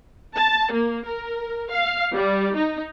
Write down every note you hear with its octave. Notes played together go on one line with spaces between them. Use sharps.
A5
A#3
A#4
F5
G3
D#4